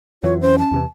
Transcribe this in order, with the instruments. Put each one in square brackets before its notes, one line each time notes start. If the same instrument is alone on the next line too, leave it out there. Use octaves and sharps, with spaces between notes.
[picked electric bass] F2 E3 F#3 [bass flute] F4 [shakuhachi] C#5
[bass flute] C#4 [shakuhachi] C5
[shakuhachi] A5
[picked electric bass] E2 C3 E3